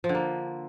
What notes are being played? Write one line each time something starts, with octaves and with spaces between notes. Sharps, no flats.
F3
D3
A#3